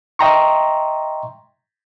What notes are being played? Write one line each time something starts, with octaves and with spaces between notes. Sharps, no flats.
D#5 E5 G5 A#5 C6 C#6